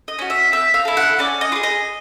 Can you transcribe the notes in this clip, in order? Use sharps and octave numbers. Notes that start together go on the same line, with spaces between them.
D#5
C#4 F#4
E5
C4 E5
F5
E4 A4
F#5
C#4 D5
D#5
F4
G#4
D#5